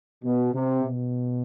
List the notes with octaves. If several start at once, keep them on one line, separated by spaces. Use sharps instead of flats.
B2
C3
B2